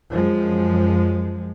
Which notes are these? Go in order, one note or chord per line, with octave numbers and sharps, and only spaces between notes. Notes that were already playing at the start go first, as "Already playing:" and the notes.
F#2 F3 G#3